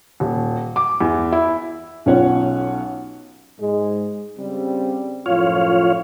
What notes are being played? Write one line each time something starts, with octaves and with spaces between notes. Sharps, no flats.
D#1
D6
E2
E4
B1 C#4 F4 C#5 F#5
G#2 G#3
C#3 G3 C4
F#2 A2 F3 F4 C#5 F5